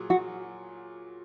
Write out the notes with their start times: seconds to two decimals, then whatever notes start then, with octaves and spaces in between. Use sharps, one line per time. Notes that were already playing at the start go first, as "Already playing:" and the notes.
Already playing: A#2 F#3 G#4
0.10 F#4